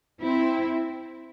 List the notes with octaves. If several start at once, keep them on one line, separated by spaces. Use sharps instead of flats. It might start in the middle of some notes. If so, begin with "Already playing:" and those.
C4 E4